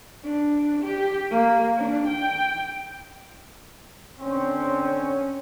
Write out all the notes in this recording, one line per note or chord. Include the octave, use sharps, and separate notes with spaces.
D4
G4
A#3
D4
G5
D3 C4 C#4